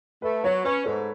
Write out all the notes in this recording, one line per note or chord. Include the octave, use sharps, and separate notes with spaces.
A3 B4
F#3 C#5
C#4 B4
G#2 A4